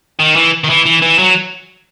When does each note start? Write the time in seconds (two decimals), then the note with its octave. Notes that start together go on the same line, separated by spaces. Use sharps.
0.20 D#3
0.36 E3
0.64 D#3
0.70 E3
0.86 E3
1.02 E3
1.19 F#3